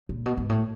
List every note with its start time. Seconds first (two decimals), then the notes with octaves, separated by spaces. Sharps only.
0.09 A#2
0.26 B2
0.37 G#2
0.50 A2